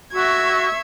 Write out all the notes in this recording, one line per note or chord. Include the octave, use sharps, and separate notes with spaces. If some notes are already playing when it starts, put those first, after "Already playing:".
F#4 E5 C#6 G#6